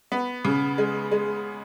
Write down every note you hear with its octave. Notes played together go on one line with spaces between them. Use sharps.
B3
C#3
G#3
G#3